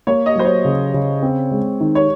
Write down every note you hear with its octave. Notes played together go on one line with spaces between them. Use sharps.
A#3 C#5
D#5
F#3 C5
C#5
C#3
C#3
C4
G#3
D#3
C#5